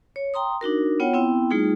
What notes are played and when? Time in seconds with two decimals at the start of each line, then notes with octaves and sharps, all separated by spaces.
0.16 C#5
0.34 G5 A#5 C6 D#6
0.61 D4 D#4 F#4 A#4
1.00 B3 F4 C#5 F#5 G5
1.14 B3 C4 E4 G5
1.51 G3 A3 D#4 F4 G#4